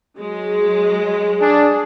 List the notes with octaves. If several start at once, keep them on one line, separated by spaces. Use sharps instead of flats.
F#3 G#3
D4 G#4